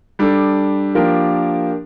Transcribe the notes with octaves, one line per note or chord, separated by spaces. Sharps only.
G3 D4 A4
F3 A#3 D4 G4 A#4